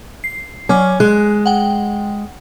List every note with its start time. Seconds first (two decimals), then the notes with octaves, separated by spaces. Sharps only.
0.24 C7
0.69 F#3 C#4 D6 F6
1.00 G#3 F#6
1.46 F#5 G5